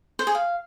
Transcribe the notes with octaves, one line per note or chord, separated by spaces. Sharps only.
C5
G#4
F5